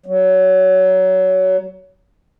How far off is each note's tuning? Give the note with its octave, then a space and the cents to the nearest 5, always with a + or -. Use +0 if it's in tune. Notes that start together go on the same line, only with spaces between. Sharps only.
F#3 +20